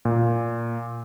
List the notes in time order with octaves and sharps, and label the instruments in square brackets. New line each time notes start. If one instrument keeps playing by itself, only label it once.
[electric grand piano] A#2